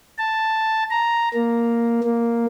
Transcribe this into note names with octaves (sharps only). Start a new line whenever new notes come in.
A5
A#5
A#3
A#3